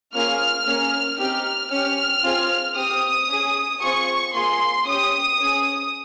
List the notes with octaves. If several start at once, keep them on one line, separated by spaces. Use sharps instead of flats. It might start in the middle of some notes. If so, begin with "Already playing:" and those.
A#3 C#4 F4 G#4 F6
A#3 C#4 G#4
C4 D#4 G4 F6
C#4 G4 F6
C4 F4 G#4
C4 G4 D#6
C#4 G#4
C4 F4 G#4 C#6
A#3 F4 G#4 C6
C#4 G4 D#6
C#4 G#4